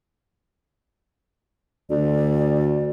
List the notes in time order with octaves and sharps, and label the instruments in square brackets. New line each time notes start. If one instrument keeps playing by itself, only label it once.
[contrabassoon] D2 [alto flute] D5